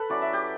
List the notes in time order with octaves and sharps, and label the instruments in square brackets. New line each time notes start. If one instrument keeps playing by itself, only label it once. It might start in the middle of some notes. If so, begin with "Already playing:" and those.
Already playing: [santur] A4 B4
F#3 C#4 E4 D5
E5
G4